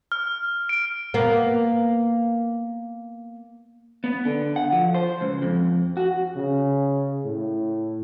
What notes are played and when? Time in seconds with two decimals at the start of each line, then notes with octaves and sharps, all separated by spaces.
0.12 F6
0.69 D7
1.14 A#3 B3
4.04 B3
4.25 D3
4.56 F#5
4.72 F3
4.95 C5
5.21 C#2
5.42 F2
5.97 F#4
6.36 C#3
7.25 A2